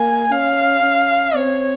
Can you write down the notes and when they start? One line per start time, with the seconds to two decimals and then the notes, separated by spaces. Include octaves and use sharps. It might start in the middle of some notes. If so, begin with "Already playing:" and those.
Already playing: A#3 G#5
0.31 C#4 F5
0.83 C#4
1.35 C4 C#5